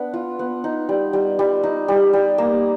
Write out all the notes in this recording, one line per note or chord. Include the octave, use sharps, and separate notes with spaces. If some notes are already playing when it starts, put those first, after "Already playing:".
Already playing: B3 D4
F4
B3
D#4
G3
G3
G3
D#4
G3
G3
A#3